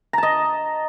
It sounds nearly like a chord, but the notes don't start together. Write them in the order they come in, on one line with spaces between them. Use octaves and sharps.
A#5 A5 D#5